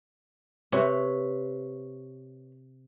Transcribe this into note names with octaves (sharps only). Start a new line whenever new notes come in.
C3 B4 C#5